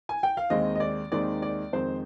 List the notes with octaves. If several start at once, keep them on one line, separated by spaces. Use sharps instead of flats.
G#5
G5
F5
D#2 D#3 G#3 C4 D#5
D#5
D5
D#2 D#3 G#3 C4 D5
D5
F2 D#3 G#3 C4 C5